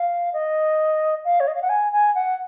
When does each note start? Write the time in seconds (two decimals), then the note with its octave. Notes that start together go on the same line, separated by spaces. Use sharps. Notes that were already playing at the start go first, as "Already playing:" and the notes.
Already playing: F5
0.33 D#5
1.25 F5
1.40 C#5
1.48 D#5
1.55 F5
1.62 F#5
1.69 G#5
1.93 G#5
2.15 F#5